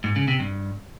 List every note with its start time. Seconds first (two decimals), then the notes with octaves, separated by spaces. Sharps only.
0.04 G#2
0.16 C#3
0.28 C3
0.40 G2